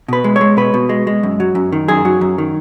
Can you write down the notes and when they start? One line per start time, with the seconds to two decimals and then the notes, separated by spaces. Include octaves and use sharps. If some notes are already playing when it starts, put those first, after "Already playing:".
0.08 B2 B4
0.24 G#3
0.36 C#5
0.41 G#3
0.57 B2 B4
0.74 B2
0.89 G#3
1.07 G#3
1.23 F#2
1.40 F#3
1.55 F#2
1.72 D#3
1.88 F#2 G#4
2.05 F#3
2.21 F#2
2.38 D#3